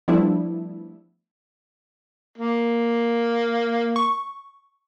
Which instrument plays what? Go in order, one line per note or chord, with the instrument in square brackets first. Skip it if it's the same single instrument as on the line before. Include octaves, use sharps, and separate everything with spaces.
[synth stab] F3 G3 A3 B3 D4 E4
[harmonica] A#3
[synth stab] C#6